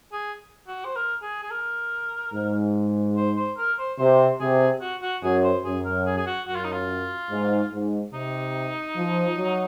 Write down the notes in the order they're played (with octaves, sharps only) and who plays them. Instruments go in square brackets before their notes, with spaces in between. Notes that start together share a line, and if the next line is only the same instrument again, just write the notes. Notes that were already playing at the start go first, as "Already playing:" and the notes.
[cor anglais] G#4
F#4
C5
A#4
G#4
G#4
A#4
[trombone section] G#2
[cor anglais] C5
C5
A#4
C5
[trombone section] C3 [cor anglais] C5
[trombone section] C3 [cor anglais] G#4
[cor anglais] F#4
F#4
[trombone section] F#2 [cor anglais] G#4
[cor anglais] C5
[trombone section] F#2 [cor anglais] G#4
[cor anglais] A#4
G#4
G#4
F#4
[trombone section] F#2 [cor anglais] F#4
[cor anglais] F4
D#4
F4
[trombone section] G#2
G#2
[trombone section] C3 [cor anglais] D#4
[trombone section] F3
F#3